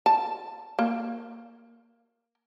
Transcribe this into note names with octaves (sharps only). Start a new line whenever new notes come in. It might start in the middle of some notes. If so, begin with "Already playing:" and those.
A5
A#3